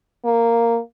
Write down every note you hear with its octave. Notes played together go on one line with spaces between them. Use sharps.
A#3